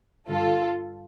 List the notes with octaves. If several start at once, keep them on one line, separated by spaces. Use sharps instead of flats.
G2 D3 F4 A4